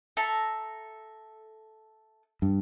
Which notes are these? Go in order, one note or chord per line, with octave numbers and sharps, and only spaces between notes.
A4 E5 A#5
G2